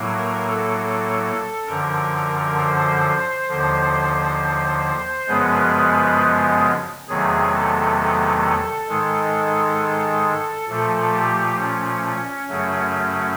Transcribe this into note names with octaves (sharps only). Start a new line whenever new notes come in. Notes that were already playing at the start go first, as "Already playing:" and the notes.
Already playing: A2 F#3 A#3
A#4
A4
A4
F#2 D3 F3 A#4
C5
D#2 D3 F3
C5
F#2 C#3 F3 G#3 B3 B4
E2 C3 D#3 F#3 A3 G#4
A4
A4
G#2 D#3 G#3
A#2 F3 A3 A4
G4
C#4
F#2 C#3 F#3 A3